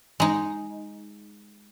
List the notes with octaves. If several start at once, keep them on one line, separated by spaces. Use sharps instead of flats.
G#3 D#4